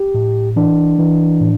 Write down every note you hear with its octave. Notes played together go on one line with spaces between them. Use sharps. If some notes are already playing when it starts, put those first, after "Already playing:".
Already playing: G4
A2
E3 D4
E3
A2